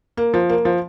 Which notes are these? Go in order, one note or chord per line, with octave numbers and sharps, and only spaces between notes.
A#3
F3
A#3
F3